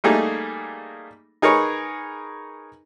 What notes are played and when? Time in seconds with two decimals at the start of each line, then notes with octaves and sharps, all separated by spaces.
0.04 G3 A3 A#3 D#4 G#4
1.42 D#4 G#4 A#4 B4 C#5